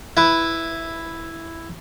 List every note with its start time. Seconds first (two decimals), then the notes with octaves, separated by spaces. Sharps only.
0.17 E4 B4